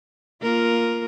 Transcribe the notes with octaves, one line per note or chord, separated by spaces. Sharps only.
A#3 F4 A#4